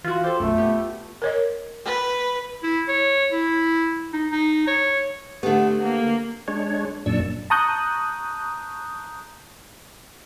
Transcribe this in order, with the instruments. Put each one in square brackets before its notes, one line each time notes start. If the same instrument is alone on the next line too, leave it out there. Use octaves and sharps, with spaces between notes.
[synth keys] E3 F#4 [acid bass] F4
[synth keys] G4 A4 [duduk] C5
[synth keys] B1 F#2 [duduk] A3
[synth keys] B3 G4
[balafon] A#4 C#5 D#5
[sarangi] B4
[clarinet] E4
C#5
E4
D#4
D#4
C#5
[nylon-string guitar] D3 B3 [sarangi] A3 [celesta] G4 F#5
[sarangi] A#3
[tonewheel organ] G#3 D4 C#5
F#2 A#2 D4 D5 C#6 E6
[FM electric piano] A5 A#5 C#6 D#6 F#6 G6